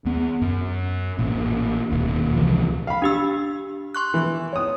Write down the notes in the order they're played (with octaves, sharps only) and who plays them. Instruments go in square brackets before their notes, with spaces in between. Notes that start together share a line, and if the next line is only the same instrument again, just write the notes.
[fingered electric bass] D#2 B3
F#2
A1 A#2
E1 D#2 A#2
C#2 C3 E3 F3
[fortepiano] F5 B5
[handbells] D4 G4 E6
C6 C#6 F#6
[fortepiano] E3
C#5 D#6